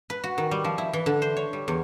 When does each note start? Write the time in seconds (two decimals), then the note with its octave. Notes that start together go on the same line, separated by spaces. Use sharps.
0.10 B4
0.24 F#4
0.38 D#3
0.51 G3
0.64 F3
0.78 E4
0.93 E3
1.06 D3
1.22 C5
1.37 C#5
1.53 G3
1.68 E2